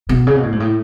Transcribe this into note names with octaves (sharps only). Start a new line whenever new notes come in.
B2
C#3
B2
A2
G#2
A2